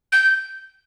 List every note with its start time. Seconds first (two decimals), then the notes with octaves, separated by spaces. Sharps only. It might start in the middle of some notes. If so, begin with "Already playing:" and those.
0.12 G6